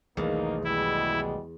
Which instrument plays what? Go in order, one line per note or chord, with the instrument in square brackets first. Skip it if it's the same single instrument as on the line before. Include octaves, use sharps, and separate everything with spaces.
[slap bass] B1 D#3 A3 [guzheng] E2 [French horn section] A#3 D#4
[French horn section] B2 G3 G#3 [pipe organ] E4